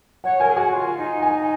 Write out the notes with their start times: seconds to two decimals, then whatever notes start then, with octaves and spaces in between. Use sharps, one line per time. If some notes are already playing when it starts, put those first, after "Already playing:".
0.24 C#5 F#5
0.40 A#4 G#5
0.49 G#4
0.56 F#4 G#5
0.73 F4
0.97 D#4
1.22 G#5